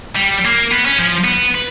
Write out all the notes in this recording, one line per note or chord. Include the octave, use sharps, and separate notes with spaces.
G3
A#3
B3
C#4
F3
B3
B4